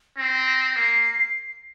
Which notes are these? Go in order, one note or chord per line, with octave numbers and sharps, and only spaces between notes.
C4 A#6
A#3 C7